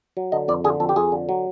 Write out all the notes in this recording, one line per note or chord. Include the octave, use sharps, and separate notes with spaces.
F#3
D3 D#5
F2 D5
D3 G#4
F2 A4
G4
F2 G#4
D3
F#3